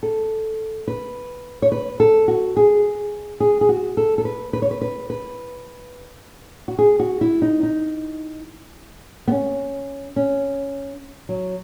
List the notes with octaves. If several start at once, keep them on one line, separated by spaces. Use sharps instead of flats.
A4
B4
C#5
B4
A4
F#4
G#4
G#4
G#4
F#4
A4
A4
B4
B4
C#5
B4
B4
B4
F#4
G#4
F#4
E4
D#4
D#4
B3
C#4
C#4
F#3